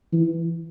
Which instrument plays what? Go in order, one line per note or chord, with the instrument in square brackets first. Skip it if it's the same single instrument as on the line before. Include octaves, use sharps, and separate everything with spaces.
[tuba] E3